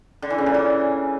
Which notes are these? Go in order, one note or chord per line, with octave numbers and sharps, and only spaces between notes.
D3
E3
C#3
A#2
E3